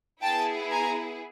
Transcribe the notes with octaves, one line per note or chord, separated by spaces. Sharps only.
B3 E4 G#4 G5 A5
G#5 A#5